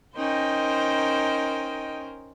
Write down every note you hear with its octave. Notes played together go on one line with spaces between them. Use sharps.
C#4 D#4 A#4 C5 D#5 G5